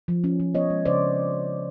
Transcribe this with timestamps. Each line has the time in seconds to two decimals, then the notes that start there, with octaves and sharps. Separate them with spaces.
0.08 F3
0.24 C#4
0.40 F3
0.55 B3 C#5 D#5
0.70 G#3
0.85 C#3 C5 D5